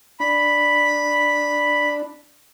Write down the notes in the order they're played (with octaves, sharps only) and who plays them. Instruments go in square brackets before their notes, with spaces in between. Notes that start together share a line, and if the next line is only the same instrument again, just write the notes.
[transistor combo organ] D4 [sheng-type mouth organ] B5